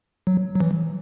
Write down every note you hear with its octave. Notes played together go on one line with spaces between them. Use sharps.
F#3
F#3
E3